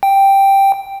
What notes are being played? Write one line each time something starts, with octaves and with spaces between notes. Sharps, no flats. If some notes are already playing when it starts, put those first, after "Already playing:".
G5